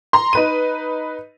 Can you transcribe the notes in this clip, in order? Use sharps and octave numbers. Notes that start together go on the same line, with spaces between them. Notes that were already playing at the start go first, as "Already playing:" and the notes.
A#5 C6
D#4 B4 D#7